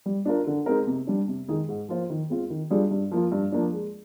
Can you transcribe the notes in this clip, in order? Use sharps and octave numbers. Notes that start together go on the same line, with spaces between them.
G3
D4 F4 A#4
D3
G#3 C4 D#4 A#4
C3
G3 D4
C3
D#3 G#3 D#4 G#4
G#2
F3 A#3 F4 C5
D#3
G#3 C4 F4
D#3
G3 D4 F4 G#4
G2
F3 A#3 F4
G2
F3 A#3 D4
G#3